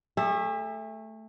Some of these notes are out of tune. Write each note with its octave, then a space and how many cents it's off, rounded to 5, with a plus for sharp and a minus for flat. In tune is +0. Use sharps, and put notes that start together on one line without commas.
A3 +0 G#4 -45 E5 +0